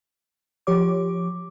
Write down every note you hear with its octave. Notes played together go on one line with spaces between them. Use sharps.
F3 G4 C#5 D6